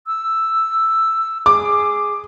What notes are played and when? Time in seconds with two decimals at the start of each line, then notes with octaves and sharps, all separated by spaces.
0.07 E6
1.46 G#4 D6